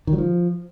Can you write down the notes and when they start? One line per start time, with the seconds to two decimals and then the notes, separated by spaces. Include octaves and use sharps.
0.07 D#3
0.13 F#3
0.18 F3